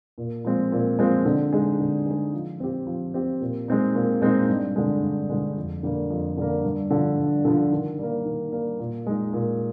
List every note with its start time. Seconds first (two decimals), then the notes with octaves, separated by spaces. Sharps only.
0.18 A#2
0.45 F3 G#3 C4
0.72 A#2
0.99 F3 G#3 C4
1.25 D3
1.53 G#3 D#4 G#4
1.79 D3
2.06 G#3 D#4 G#4
2.33 F3
2.60 C4 G4
2.87 F3
3.14 C4 G4
3.41 A#2
3.68 G#3 C4 D#4
3.95 A#2
4.22 G#3 C4 D#4
4.48 G2
4.76 D3 G#3
5.02 G2
5.29 D3 G#3
5.56 F2
5.83 D3 G3 A#3
6.10 F2
6.37 D3 G3 A#3
6.64 G2
6.91 D3 F3
7.18 G2
7.45 D3 F3
7.72 D#3
7.99 G3 A#3
8.25 D#3
8.52 G3 A#3
8.80 A#2
9.07 G#3 D#4
9.33 A#2